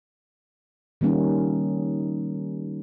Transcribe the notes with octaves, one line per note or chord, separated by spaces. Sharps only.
D#3 G3 A#3 C#4 D#4